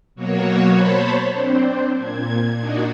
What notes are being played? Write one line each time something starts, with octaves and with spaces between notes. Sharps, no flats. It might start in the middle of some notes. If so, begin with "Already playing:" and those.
B2 F#3 A#3 F#4 C#5
C5 C#5 A5 B5
C4 D4 C5
A#2 G#6
A#2 D4 D#4 F#4